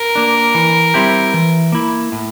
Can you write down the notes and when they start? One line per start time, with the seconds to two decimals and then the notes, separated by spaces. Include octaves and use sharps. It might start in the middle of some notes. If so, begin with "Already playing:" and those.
Already playing: A#4
0.15 A#3 D4
0.55 E3
0.94 G3 C4 E4 G4
1.34 E3
1.72 A#3 E4
2.12 A2